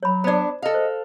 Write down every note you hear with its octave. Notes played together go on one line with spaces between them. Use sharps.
F#3 C#5 B5
B3 D4 C5 D5
A4 D#5 F5
C5